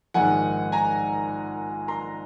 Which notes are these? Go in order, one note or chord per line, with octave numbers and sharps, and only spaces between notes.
A#1 G#2 D#3 G#3 F#5 G#5
G#5 A#5
A#5 C6